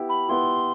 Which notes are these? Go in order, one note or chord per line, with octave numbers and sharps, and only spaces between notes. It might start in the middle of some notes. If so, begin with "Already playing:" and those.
Already playing: B3 E4 G4
B5
B3 E4 G4 C6